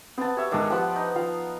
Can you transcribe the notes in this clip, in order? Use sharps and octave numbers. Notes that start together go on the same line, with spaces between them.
B3 C4 A5
G4 C#5 E5
G#2 D#3 D4
F3 B3 G4 F#5
D#4
F3 F5